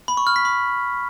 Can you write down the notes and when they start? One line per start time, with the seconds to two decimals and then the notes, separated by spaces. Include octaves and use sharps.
0.08 B5
0.17 C#6
0.27 F6
0.36 B6
0.45 B5